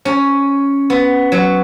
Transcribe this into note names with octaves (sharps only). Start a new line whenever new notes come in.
C#4
B3
F#3